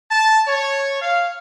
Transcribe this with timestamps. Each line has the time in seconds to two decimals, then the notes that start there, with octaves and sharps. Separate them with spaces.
0.10 A5
0.48 C#5
1.02 F5